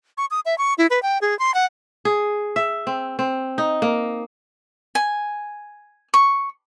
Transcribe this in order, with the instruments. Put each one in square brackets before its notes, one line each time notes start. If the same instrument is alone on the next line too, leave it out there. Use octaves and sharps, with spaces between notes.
[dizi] C#6
D#6
E5
C#6
E4
B4
G5
G#4
C6
F#5
[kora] G#4
E5
C4
C4
D#4
A#3
[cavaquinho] G#5
C#6